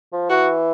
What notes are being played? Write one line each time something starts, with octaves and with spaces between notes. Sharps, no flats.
F3
E3 F#4